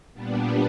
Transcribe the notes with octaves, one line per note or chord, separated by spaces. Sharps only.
A#2 G3 B3 D4